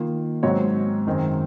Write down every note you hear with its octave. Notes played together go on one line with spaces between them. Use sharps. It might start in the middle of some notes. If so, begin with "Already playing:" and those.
Already playing: D#3 A#3 F4
G#2 F#3 C4 F#4 C#5
F#2 D#3 G#3 C4